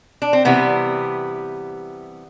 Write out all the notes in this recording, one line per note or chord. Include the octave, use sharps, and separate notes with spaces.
D4
C4
C3 E3 G3 B3